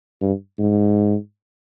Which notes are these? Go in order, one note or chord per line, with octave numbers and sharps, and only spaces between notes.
G2
G#2